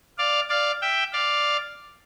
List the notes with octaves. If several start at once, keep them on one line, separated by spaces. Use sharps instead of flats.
D5 F5
D5 F5
E5 G5
D5 F5